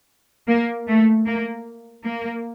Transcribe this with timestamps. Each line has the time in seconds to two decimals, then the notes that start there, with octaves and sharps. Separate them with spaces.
0.48 A#3
0.88 A3
1.27 A#3
2.04 A#3